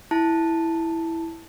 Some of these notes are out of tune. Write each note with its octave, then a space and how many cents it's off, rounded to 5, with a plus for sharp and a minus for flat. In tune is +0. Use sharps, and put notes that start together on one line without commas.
E4 +0 A5 +0